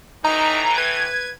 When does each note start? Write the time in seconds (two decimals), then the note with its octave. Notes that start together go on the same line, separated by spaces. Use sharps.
0.25 A2 E3 D#4 A#5
0.78 B4 G#6